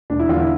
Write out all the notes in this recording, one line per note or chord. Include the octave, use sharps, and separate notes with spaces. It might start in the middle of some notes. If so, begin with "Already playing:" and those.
E1 D4
E4
E2 D3 F4
E4